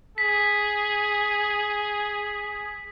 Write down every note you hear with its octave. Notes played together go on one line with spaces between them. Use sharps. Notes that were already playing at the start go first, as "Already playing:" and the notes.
G#4 B6